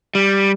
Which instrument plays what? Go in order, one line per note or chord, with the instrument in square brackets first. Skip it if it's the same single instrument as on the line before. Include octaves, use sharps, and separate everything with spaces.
[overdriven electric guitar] G3